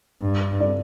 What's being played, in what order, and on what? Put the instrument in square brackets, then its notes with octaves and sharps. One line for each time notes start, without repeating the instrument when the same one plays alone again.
[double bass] G2
[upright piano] D5